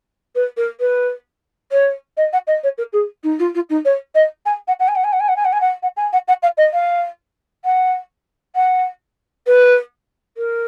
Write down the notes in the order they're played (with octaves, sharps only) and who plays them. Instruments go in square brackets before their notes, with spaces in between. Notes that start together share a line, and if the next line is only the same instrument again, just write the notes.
[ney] B4
A#4
B4
C#5
D#5
F#5
D#5
C#5
A#4
G#4
D#4
F4
F4
D#4
C#5
D#5
G#5
F#5
F#5
G#5
F#5
G#5
F#5
G#5
F#5
G#5
F#5
G#5
F#5
F#5
G#5
F#5
F#5
F5
D#5
F5
F#5
F#5
B4
A#4